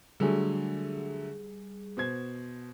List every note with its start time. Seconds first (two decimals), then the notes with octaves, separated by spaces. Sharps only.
0.20 D3 F#3 G3 A3 G#4
1.97 B2 C5 G#6